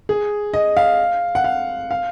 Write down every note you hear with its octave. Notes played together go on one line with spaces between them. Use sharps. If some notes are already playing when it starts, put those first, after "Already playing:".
G#4
D#5
F5
F#5
F5
F5